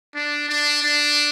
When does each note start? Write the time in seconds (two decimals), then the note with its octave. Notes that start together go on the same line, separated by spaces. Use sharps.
0.15 D4
0.49 D4
0.83 D4